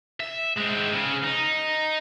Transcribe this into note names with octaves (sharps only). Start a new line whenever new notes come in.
E5
G#3 C4
C#3
D#4